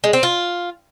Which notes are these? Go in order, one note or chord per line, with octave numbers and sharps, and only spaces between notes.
G#3
C4
F4